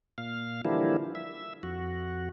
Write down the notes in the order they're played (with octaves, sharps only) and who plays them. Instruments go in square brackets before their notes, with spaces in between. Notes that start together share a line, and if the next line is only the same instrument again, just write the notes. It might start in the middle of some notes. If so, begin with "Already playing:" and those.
[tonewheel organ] A#2 F5
D3 E3 F3 G3 A#3 E4
E5
F2 F#4